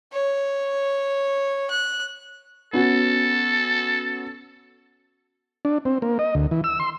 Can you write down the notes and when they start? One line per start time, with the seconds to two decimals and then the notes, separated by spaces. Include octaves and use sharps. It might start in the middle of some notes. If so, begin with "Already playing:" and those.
0.13 C#5
1.71 F#6
2.73 B3 C#4 F#4 A4
5.65 D4
5.85 C4
6.02 A#3
6.19 D#5
6.35 D2
6.51 E3
6.64 E6
6.80 C6